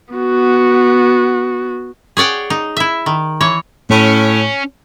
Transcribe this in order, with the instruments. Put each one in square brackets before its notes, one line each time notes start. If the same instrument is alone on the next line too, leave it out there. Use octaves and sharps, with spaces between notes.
[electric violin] B3 F#4
[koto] G#4 C#5 D5 F#5 G5
D#4
E4 E5
D#3
E3 C#5
[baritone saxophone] A2 [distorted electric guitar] C#4